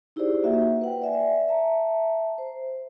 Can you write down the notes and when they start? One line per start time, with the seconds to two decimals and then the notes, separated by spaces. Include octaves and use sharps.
0.16 D#4 E4 G4 G#4 C5 D5
0.43 A#3 F#4 E5 F#5
0.81 B4 F#5 G5
1.02 D5 E5 G#5
1.48 E5 A5 A#5
2.38 C5